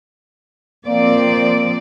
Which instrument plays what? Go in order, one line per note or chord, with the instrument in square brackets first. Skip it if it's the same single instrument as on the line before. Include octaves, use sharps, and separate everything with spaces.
[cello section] F3 C4 D5 [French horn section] A#3